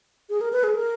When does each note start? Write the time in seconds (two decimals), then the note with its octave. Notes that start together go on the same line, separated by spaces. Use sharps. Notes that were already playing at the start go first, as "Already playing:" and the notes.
0.30 G#4
0.41 A#4
0.53 B4
0.64 G#4
0.75 A#4